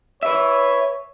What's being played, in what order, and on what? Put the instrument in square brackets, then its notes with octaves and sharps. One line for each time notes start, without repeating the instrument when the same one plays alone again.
[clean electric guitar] B4 E5 [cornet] C#5